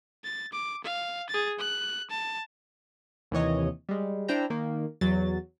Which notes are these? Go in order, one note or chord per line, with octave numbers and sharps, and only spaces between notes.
A6
D6
F5
G#4 A6
F#6
A5
D#2 C3 E3 C#5 D#5
G3 G#3
D4 E4 C5 G5 A#5
D#3 A#3
E2 F#3 A6